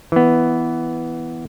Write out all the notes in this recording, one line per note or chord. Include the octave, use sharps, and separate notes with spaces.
E3 B3